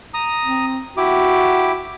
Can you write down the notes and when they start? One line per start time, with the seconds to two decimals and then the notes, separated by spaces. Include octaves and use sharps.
0.14 A#5 D#6
0.44 C4
0.97 E4 F#4 G4 D6